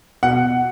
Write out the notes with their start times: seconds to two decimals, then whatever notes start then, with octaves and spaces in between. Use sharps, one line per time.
0.23 B2 F#5